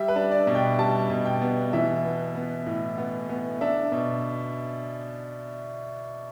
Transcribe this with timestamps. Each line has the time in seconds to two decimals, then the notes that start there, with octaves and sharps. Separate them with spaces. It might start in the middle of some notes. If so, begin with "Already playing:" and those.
Already playing: G3 E5
0.08 B4
0.16 D4
0.31 D5
0.47 B2
0.55 G5
0.79 G3 A5
1.10 B2
1.26 G5
1.41 B3
1.73 E3 E5
2.04 B3
2.35 B3
2.66 A2
2.98 B3
3.29 B3
3.61 D4 E5
3.92 B2